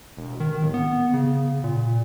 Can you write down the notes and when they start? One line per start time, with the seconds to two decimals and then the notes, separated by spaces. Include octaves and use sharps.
0.17 E1
0.40 D#3
0.61 D1
0.74 B3
1.14 C#3
1.64 A#2